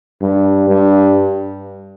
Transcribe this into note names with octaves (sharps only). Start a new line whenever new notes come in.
G2
G2